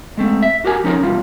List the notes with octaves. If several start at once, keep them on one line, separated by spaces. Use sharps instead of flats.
G#3 A3 C4
E5
F#4 G4 A#4 G#5
F3 C#4 D#4 A#4
B1 E2 A#2 G3 F4